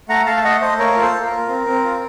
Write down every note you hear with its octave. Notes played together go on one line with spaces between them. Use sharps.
A3 F#5 A#5
A3 F5 A5
A5
A3 D#5 F#5
A3 C5 D#5
A#3 A#4 C#5
F4 A#4
A4 C5
A#3
A#4
F4
C4
C4
F4